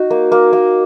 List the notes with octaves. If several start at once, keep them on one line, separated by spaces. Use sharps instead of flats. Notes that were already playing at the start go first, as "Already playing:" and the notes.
Already playing: D#4 F#4
A#3
A#3
A#3